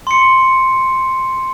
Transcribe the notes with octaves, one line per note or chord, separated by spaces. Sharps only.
C6 C#7